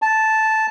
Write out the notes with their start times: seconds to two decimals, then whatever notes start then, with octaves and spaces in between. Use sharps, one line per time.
0.02 A5